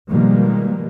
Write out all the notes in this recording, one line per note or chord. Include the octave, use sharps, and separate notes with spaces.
B2 D#3 F3 G3 G#3 A#3